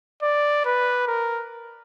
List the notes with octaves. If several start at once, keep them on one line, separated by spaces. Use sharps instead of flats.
D5
B4
A#4